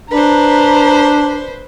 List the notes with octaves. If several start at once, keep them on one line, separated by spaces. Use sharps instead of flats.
D4 B4 C5 A#5